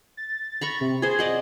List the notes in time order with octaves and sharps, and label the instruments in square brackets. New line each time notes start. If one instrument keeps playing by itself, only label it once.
[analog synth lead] A6
[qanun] A#5 B5 C#6
[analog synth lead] C3
[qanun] G#4 C5 [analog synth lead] G#6
[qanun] D5 D#5 F#5